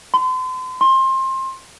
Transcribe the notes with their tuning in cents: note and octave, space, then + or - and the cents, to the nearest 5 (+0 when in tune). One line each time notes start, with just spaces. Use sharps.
C6 -40
C6 +25